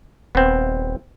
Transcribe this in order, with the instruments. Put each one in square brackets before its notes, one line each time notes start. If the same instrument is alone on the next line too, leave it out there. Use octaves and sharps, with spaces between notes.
[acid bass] D#1 [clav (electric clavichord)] B3 C4